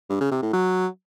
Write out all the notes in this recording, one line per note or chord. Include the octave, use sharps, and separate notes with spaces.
G2
C#3
C3
A2
F#3